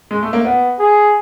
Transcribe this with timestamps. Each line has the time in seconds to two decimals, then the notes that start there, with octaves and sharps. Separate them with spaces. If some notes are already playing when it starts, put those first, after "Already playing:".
0.11 G#3
0.23 A3
0.33 A#3
0.45 B3
0.79 G#4